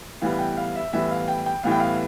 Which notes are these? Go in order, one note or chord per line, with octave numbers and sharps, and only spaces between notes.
A2 E3 G3 B3 F5
G5
F5
E5
A2 E3 G3 B3 E5
F5
G5
G5
A2 E3 G3 B3 F5
G5
F5